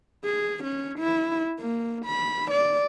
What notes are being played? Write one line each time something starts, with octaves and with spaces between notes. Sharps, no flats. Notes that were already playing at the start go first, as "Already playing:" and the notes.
G#4
C#4
E4
A#3
B5
D5